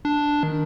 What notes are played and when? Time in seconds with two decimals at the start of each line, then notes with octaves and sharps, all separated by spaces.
0.05 D4
0.43 D#3